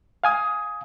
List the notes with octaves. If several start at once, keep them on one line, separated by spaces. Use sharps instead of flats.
F5 G#5 D#6